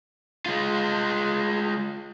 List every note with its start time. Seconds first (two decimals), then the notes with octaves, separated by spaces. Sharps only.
0.46 G#3 F4